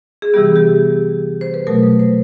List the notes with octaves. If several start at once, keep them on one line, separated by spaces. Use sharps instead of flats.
G#4
C3 E3 G3 B3 G4
G4
C5
B4
B2 F#3 A3 A#4
B4
C5